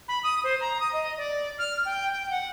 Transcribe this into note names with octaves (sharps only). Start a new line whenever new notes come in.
B5
D#6
C5
A#5
D#6
D#5
D5
F6
G5
G5
F#5